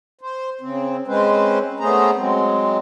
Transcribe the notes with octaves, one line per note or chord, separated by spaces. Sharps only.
C5
C#3 C4
G#3 C4 C#4 B4 C5
A3 B3 C#4 G#4 C5 A#5
F#3 G#3 C4